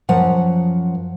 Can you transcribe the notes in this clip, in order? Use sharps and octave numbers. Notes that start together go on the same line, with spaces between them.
F#2 F3 F#5